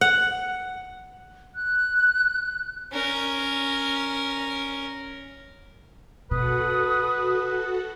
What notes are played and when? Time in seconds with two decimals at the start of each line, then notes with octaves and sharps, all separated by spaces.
0.01 F#5
1.55 F#6
2.92 C#4 A#4
6.31 B2 F#4 A4 B4 F#5 D#6